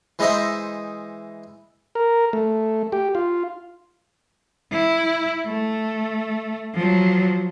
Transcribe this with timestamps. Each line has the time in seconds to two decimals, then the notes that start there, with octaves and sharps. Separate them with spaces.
0.19 E3 G#3 D#4 C5 D#5 E5
1.95 A#4
2.33 A3
2.92 G4
3.15 F4
4.72 E4
5.47 A3
6.74 F3 F#3